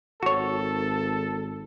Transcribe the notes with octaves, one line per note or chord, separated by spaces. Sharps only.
G#1 F#4 A4 C#5